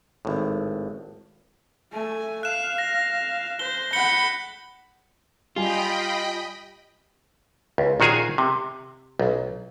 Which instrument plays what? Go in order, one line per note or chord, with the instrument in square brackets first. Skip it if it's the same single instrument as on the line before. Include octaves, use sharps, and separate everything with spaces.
[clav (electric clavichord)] G#1 A2
[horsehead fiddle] A3 G#5
[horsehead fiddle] F5 [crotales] F#6 E7
[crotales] A#6
[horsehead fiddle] C5 [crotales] G7
[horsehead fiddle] F#5 B5 [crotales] G6 C#7 G7
[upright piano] G3 G#5 [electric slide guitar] F4 [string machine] D#5 G5 B5
[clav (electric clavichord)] C#2
A#1 D#3 F#4 G#4 F5 G#5
C3
B1